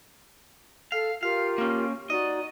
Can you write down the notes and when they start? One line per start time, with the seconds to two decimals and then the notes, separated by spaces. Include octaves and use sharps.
0.92 A4 F5
1.23 F4 G4 A#4 F5
1.58 A#3 C#4
2.10 D#4 F#4 D5 D#5